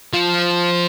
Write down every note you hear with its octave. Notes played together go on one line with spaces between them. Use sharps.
F3